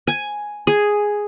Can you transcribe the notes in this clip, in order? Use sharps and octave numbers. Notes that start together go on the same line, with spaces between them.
G#5
G#4